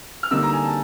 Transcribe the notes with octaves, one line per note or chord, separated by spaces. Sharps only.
F6
D3 G3 A#3 D#4 E6
A#5
G#5
A5